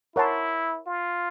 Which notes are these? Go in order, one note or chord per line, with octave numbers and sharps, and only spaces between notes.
E4 A#4 C#5 F#5 A5 C6
F4